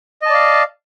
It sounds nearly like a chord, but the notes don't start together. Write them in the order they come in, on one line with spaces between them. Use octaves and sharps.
D#5 A5 D5 F5